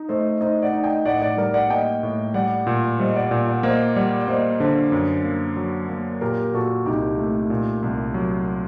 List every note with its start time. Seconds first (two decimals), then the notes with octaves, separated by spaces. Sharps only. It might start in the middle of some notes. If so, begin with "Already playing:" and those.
Already playing: D#4
0.09 A3 C5 D#5
0.41 D#4 C5 D#5
0.62 D5 F#5
0.73 D#4
0.84 D#5 G5
1.05 A2 D5 F#5
1.14 D#5
1.22 D5 F#5
1.37 G3 A#4 D5
1.54 D5 F#5
1.70 A#3 D#5 G5
2.03 A2
2.34 G3 D5 F#5
2.67 A#2
2.99 G3 C5 D#5
3.15 D5 F#5
3.31 A#2
3.47 D5 F#5
3.63 A#3 C5 D#5
3.95 G3 D5 F#5
4.20 D5
4.28 A#3 C5 D#5
4.60 D3 A4 C5
4.92 F#2
5.24 A#3
5.56 F#3
5.89 A#3
6.21 A#2 G4 A#4
6.53 A#2 F#4 A4
6.86 C2 D#4 G4
7.18 A3
7.50 A#2
7.83 C2
8.14 F#3